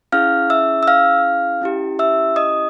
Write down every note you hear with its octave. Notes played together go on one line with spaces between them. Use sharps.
C#4 E4 G#4 F5 F6
E5 E6
E6
F5 F6
C#4 E4 G4
E5 E6
D#5 D#6